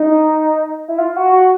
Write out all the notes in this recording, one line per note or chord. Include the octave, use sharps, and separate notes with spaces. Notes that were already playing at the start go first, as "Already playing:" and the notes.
Already playing: D#4
E4
F4
F#4
F#4